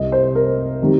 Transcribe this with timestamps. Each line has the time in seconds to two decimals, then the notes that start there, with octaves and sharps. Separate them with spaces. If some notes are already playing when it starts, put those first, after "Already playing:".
Already playing: C2 C3 G3 D#5
0.12 C5
0.35 A#4
0.82 C3 D#3 G3